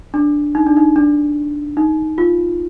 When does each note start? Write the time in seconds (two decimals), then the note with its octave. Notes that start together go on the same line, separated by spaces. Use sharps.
0.14 D4
0.55 D#4
0.66 D4
0.77 D#4
0.96 D4
1.77 D#4
2.18 F4